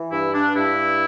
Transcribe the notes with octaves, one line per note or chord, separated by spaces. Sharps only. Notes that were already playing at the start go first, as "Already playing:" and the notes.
Already playing: E3
G2 E4
D4
G2 E4